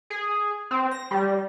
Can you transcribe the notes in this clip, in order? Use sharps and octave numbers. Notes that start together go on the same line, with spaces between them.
G#4
C4
A#6
G3